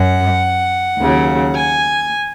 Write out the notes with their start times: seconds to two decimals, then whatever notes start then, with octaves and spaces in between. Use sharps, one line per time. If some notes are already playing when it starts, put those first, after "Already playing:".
Already playing: F#2 F#5
0.99 D#2 C#3 F#3
1.54 G#5